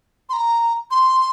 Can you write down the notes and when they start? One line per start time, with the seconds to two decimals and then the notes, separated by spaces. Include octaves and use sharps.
0.29 C6
0.33 A#5
0.91 C6